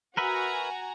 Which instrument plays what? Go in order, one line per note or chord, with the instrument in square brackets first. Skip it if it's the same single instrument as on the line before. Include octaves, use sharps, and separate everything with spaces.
[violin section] F#4 G#5 A#5 [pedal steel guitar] A#4 B4 E5